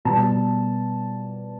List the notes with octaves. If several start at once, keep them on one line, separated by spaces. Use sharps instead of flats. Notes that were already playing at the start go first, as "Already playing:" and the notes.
B2 G3 A5